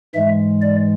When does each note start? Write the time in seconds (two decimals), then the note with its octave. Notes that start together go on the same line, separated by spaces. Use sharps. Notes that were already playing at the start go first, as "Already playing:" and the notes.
0.14 G#2 E3 G#3 E5
0.62 D5